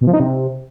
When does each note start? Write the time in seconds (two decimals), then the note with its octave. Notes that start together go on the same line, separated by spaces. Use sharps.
0.01 B2
0.07 F3
0.14 D#4
0.20 C3